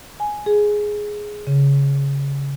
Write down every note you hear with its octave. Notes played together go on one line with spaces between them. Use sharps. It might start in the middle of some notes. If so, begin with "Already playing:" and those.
G#5
G#4
C#3